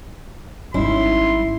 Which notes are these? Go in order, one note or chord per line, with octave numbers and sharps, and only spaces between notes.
G#1 G3 C#4 D#4 E4 C6